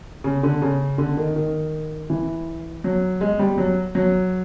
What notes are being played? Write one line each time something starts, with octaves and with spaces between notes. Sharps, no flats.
C#3
D3
C#3
D3
D#3
D#3
E3
F#3
G#3
G3
F#3
F#3